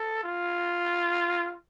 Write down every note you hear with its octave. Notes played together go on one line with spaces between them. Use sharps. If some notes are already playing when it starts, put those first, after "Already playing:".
Already playing: A4
F4